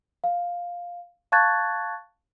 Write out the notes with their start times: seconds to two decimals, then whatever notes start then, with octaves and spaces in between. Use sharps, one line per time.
0.24 F5
1.32 F5 A5 C#6 F#6 G#6 A6